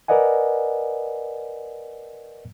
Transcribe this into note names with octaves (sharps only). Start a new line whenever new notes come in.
A#4 B4 D5 D#5 F#5 G#5